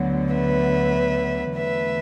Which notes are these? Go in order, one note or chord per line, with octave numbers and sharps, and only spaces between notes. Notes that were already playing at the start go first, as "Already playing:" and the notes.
Already playing: D2 D3 F#3 B3
B4 E5
E2 D3 A3 B4 E5